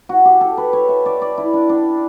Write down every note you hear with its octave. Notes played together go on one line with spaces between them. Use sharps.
F#4
G4
A4
B4
C#5
E5
D5
D5
E4
D4
D4